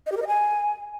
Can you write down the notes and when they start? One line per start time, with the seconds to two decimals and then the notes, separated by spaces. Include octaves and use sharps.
0.06 D#5
0.12 G4
0.17 A#4
0.22 D#5
0.27 G#5